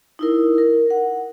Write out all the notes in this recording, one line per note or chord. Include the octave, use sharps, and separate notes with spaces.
D#4 E4 A#4
A#4
F#5